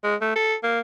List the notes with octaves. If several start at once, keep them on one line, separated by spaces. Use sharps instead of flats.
G#3
A3
A4
A#3